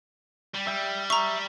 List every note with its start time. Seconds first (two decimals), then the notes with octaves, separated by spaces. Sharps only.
0.55 G3
0.67 G3 E5 G5
1.10 E5 A#5 C#6